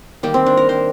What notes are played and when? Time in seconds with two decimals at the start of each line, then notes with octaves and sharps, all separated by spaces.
0.23 D#3 G3 A#3 G4
0.34 C4
0.46 D4
0.57 A#4
0.69 C5